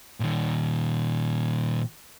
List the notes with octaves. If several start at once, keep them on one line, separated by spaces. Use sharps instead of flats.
A#2 D#3